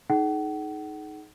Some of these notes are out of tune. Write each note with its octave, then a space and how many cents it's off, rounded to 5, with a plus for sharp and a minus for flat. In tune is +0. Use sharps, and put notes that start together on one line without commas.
D#4 +0 G#4 +35 F#5 +35